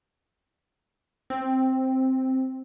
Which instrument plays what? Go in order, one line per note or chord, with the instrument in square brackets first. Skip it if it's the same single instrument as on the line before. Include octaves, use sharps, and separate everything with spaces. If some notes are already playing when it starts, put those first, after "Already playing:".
[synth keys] C4